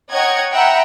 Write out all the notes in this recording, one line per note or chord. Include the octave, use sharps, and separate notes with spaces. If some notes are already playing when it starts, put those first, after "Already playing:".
C#5 D#5 F#5 G5 A#5 G#6
E5 F#5 G5 A#5 B5